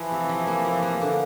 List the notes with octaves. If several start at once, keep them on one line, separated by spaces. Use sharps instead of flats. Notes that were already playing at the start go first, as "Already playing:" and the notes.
Already playing: E3 F3
C3
F3
A#3
F3
A#3
D3